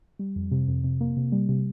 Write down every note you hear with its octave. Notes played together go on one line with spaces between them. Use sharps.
G3
F2
C3
F2
C3
A#3
C3
G3
C3